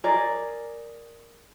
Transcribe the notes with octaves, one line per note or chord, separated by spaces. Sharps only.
G#4 A#4 D5